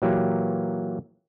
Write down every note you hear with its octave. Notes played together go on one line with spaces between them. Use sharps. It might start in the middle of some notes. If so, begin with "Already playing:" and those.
A#2 E3 F#3 A#3 G4